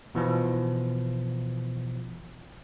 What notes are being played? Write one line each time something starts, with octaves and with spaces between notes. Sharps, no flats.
B2 E3 F3